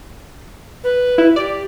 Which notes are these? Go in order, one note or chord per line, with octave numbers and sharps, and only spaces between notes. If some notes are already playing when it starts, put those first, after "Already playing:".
B4
E4
G4 D5